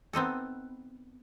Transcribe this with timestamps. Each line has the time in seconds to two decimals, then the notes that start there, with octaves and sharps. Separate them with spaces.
0.13 B3 C4 D#4 A4